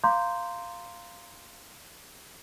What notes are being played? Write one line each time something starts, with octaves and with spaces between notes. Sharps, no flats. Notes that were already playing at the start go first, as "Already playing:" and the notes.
F5 A#5 C6 D6 G6